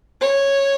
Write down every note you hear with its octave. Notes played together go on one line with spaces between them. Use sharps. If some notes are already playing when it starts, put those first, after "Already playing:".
C#5